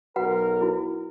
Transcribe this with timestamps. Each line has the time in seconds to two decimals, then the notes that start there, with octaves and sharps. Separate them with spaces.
0.16 B1 F#4 A#4 B4 F#5
0.61 E4 F#4